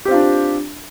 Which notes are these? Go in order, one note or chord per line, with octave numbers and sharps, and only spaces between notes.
C4 D4 F4 G4